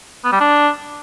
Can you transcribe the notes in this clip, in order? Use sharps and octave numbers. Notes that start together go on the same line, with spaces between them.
B3
G3
D4